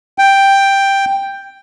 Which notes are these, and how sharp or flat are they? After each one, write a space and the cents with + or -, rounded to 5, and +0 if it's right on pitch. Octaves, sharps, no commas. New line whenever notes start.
G5 +5